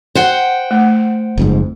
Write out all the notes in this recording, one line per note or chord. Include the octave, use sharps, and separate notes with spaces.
C5 F#5 G5
A3
F#1 F2 G#2